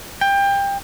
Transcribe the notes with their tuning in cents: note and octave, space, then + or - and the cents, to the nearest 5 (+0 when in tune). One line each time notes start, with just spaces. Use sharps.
G5 +25